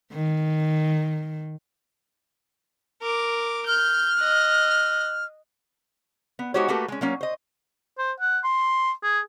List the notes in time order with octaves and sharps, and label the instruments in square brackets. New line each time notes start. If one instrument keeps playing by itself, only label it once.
[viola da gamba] D#3
[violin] A#4 D6
[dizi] F6 [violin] G6
[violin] D#5 F#6
[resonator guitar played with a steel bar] B3
G#3 D#4 F#4 G4 C5 C#5
A3 A#3 F#4 G4 A4 B4
G#3 C#4
F#3 A#3 C#4
C5 D#5
[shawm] C5
F#5
C6
G#4